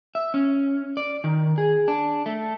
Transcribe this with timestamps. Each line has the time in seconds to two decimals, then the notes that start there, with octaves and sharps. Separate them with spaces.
0.15 E5
0.34 C#4
0.97 D5
1.24 D#3
1.58 G#4
1.88 D4
2.26 A3